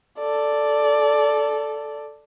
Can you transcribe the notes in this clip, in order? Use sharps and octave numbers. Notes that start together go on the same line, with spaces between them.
A4 D5